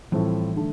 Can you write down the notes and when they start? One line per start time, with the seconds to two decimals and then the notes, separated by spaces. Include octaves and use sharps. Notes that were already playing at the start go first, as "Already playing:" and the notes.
0.12 A2 E3 F3 G3 A3 C4
0.56 D3 A3